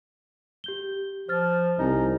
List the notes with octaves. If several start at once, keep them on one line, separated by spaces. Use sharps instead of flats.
G4 G6 G7
F3 C5 F6 A6
C2 D#4 D#5 G#5